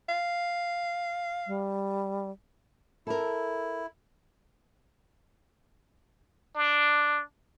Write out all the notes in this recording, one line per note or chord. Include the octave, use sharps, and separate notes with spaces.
F5
G3
E4 A4 A#4
D4